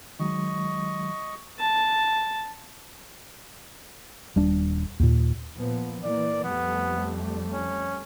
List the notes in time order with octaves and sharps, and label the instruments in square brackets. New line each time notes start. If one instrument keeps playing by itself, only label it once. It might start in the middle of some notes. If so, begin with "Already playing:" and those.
[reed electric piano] D#3 F#3 G#3 [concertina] D#5 C#6
[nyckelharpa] A5
[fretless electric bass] D#1 G3 D4
D#2 A#2
[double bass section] A#2 F3 B3
[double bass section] E3 A#3 [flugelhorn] D5
[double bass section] F2 G3 A3 [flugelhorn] B3
[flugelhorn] C#4